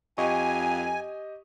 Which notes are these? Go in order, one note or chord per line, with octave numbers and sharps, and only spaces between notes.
F2 G4 D#5 G#5 C#6